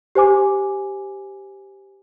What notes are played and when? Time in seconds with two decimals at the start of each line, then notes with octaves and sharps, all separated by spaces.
0.15 G4 C5 G#5 D6